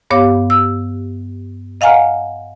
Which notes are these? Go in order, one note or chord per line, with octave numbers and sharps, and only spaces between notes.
G2 B3 G4 C#5 F5 D6
E6
D#5 F5 F#5 G#5 A#5 F6